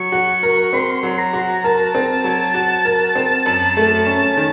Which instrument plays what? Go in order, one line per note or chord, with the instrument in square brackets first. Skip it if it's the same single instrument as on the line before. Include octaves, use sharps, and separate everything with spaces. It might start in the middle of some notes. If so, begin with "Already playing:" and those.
Already playing: [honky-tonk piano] F#3 [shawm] C#6
[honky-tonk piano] F#4
A#4
[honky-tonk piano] C4 [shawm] C6
[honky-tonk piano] F#3
[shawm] A#5
[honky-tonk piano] F#4
[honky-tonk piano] A#4 [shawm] A5
[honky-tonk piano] C4
F#3
F#4
A#4
C4
F#2
A3
C#4
D#3